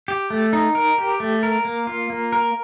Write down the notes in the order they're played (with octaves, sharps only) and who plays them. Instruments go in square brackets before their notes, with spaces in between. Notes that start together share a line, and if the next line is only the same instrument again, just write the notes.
[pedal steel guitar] G4
A3
D#4
A#4
G4
A3
A#4
A#3
F4
A#3
A#4